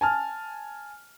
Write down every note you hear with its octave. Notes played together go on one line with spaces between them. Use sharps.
G#5 A5 F6